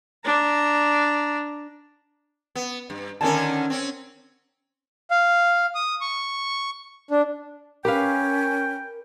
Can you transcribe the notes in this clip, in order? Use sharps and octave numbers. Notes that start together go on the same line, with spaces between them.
D4 A#5
B3
G2
D3 D#3 C#4 A#4 G#5 A5
C4 C#4
F5
D#6
C#6
D4
C#4 G4 A#4 B4 F5 G5